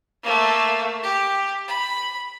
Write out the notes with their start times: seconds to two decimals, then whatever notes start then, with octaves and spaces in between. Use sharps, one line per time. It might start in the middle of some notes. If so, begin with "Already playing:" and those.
0.23 A3 A#3
1.03 G4
1.67 B5